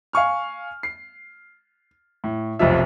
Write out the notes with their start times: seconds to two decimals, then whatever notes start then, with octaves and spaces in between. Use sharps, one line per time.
0.13 F5 G#5 C#6 F6
0.83 C7
2.24 A2
2.59 F1 B1 C3 F3 E5